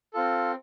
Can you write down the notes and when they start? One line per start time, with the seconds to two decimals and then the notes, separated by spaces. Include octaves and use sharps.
0.14 C4 F4 A4